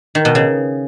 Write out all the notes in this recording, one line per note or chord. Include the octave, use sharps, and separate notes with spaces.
D#3
B2
C#3